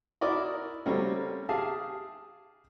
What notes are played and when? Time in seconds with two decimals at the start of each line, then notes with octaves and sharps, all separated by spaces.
0.21 E4 F#4 A#4 D5 D#5
0.86 G3 A3 A#3 C4 C#4 F#4
1.49 G4 G#4 E5 F5 A5